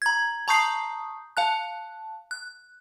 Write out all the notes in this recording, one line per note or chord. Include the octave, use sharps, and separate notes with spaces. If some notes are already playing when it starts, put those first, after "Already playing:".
A#5 G#6
A5 A#5 C#6 D#6 G6 C7
F5 A5 F#6
F#6